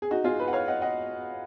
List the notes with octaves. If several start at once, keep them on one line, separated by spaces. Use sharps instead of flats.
G#4
D#4 F#4
F4 G#4
G#4 B4
F#5
C#5 F5
D#5 F#5
D#5 F#5